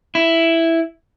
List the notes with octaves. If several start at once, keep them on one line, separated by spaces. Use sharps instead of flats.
E4